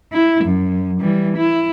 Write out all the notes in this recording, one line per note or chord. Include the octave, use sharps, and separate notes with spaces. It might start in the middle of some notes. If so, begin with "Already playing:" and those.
E4
F#2
E3 G3
E4